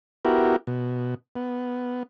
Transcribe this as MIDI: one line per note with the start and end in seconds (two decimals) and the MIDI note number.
0.25 0.56 59
0.25 0.56 64
0.25 0.56 66
0.25 0.56 67
0.25 0.56 70
0.67 1.14 47
1.36 2.03 59